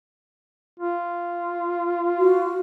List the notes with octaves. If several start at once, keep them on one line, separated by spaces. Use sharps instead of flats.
F4
F#4